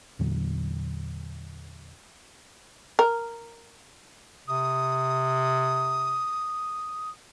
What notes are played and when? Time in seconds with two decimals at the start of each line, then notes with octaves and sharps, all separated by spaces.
0.19 E2 A#2 D3 F#3
2.99 A#4
4.48 C3 D#6